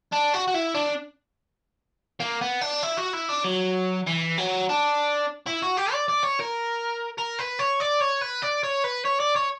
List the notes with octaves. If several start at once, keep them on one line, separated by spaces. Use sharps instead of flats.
D4
F#4
F#4
E4
D4
A#3
B3
D4
E4
F#4
E4
D4
F#3
E3
F#3
D4
E4
F#4
G4
D5
D5
C#5
A#4
A#4
B4
C#5
D5
C#5
B4
D5
C#5
B4
C#5
D5
C#5